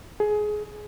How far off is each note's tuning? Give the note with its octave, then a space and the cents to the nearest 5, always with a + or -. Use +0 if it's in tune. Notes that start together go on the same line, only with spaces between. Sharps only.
G#4 +20